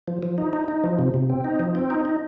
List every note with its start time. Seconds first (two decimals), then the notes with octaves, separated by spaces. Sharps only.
0.08 F3
0.23 F3
0.38 D#4
0.53 D#4
0.68 D#4
0.84 F3
0.99 C3
1.14 C3
1.30 C4
1.44 D#4
1.59 F3
1.75 C4
1.90 D#4
2.05 D#4